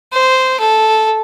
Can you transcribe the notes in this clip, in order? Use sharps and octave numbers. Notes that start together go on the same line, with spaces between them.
C5
A4